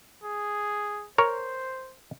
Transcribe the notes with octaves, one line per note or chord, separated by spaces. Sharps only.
G#4
A#4 C5 C#5